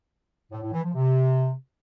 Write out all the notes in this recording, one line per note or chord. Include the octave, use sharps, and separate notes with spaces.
A2
A2
E3
F3
C3